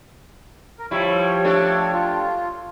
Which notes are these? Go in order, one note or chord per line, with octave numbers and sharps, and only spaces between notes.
A#4
F3 G3 E4 C#5
A3 D4 G4
F4